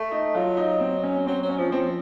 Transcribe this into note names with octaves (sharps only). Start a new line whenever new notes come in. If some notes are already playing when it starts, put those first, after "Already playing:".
Already playing: A3
D#4
F#3 F4
D#4
C4
C#4
F#3 C4
F#3
C#4
F3
F3 C4